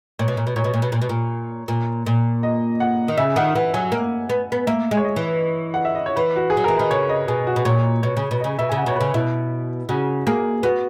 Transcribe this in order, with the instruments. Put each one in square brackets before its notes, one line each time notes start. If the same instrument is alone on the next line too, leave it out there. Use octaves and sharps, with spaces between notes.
[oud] A#2 [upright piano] C#5
[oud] B2
A#2
B2
[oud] A#2 [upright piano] C#5
[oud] B2
A#2
B2
A#2
B2
A#2
A#2
A#2
[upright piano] D#5
F#5
[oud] D#3
[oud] C#3 [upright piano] E5
[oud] D#3 [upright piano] F#5
[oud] E3 [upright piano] F#5
[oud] F#3 [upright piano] G#5
[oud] A#3
B3
B3
[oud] A#3 [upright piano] E5
[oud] G#3
[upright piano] C#5
D#5
[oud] E3
[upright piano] F#5
E5
D#5
C#5
[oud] E3 [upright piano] B4
[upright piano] F#4
G#4
[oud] F#3
[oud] E3 [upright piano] A#4
[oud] D#3 [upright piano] B4
[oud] C#3 [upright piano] C#5
[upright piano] D#5
[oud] B2 [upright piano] G#4
[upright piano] F#4
[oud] B2
[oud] A#2 [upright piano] C#5
[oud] B2 [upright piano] C#5
[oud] C#3
B2
[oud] C#3 [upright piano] D#5
[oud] B2 [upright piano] E5
[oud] C#3 [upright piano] G#5
[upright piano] F#5
[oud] B2 [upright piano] C#5
[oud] C#3 [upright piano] B4
[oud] B2 [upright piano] E4
[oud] C#3 [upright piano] F#4
[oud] A#3 [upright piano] G#4
[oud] B3 [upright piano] F#4